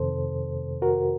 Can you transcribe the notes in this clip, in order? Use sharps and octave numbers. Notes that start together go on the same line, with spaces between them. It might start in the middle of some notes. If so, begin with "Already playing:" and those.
Already playing: F2 C3 D#3 A4 C5
F#4 A#4